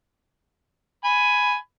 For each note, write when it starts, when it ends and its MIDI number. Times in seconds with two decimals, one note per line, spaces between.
1.04 1.56 80
1.04 1.56 83